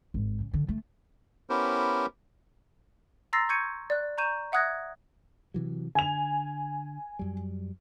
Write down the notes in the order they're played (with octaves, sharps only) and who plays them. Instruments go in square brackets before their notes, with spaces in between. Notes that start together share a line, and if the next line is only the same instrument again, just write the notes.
[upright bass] G#1
C#3
D3
A3
[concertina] B3 C#4 E4 G4 A#4 C5
[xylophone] A#5 C6 E6 A6 A#6 C7
C#6 G6 G#6 C#7 D#7
D5 F#6
A#5 C#6 G6 D#7 E7
E5 F#5 D#6 F#6 G#6 A#6
[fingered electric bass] C3 E3 F#3
[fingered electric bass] D3 [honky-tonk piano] G#5 F7
[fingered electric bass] F#2 G3